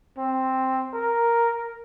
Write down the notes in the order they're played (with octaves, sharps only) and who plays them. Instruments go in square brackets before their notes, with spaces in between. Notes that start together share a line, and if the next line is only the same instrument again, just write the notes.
[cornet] C4
A#4